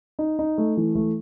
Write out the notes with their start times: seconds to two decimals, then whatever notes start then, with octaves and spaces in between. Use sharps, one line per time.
0.19 D#4
0.39 D#4
0.58 A3
0.77 E3
0.95 A3